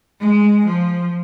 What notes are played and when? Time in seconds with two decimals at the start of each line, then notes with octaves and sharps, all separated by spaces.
0.20 G#3
0.65 F3